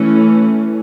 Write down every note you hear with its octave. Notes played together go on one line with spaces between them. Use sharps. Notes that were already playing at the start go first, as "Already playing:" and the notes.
Already playing: E3 A3 C#4